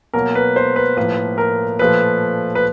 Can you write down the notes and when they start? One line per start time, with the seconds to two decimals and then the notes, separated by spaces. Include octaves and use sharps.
0.14 B2 F#3 A#3 A#4
0.35 B4
0.56 C5
0.76 B4
0.97 A2 F3 A#3 B4
1.38 A#4
1.79 A#2 F3 A3 B4
2.55 B4